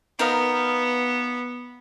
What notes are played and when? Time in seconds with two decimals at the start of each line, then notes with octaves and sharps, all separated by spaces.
0.19 B3 D#4 A#4 F5